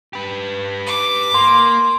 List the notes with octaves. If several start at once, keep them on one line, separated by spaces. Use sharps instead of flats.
G4 B4
D6
A#3 C6